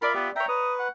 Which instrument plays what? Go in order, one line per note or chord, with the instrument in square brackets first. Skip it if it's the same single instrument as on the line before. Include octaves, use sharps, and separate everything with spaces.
[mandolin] F4 D5 E5 [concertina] A#4 [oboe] B5
[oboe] B3 [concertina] G4
[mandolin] C#5 A#5 [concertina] E5 [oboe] G5
[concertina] B4 [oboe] D#6
[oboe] F#5